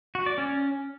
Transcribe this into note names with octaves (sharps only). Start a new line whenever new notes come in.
F#4
D5
C#4